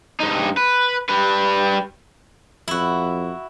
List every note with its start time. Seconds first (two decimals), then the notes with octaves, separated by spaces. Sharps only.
0.20 G2 D#4
0.57 B4
1.09 G3 B4
2.68 F2 E4 F#4